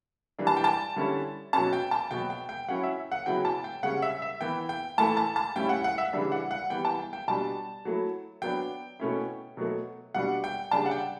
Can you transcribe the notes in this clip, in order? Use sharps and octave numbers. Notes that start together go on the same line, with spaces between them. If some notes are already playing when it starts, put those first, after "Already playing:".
E3 G3 D4
A5
G5
A5
D3 G3 C#4 E4
B2 F#3 C#4 A5
G5
A5
B2 F#3 B3 G5
G5
G5
F#3 C#4 E4 F#5
E5
F#5
C#3 F#3 B3 E4 G5
A5
G5
C#3 G3 C#4 F#5
E5
E5
E3 B3 E4 G5
G5
A2 E3 A3 E4 A5
A5
A5
A2 G3 C#4 E4 G5
F#5
F#5
E5
C#3 E3 G3 D4
F#5
F#5
E3 G3 B3 G5
A5
G5
G5
B2 G3 D4 A5
F#3 A3 E4
F#3 B3 D4 G5
B2 A3 C#4 E4
B2 F#3 A3
B2 G3 D4 F#5
G5
C#3 G3 D4 A5
F#5
G5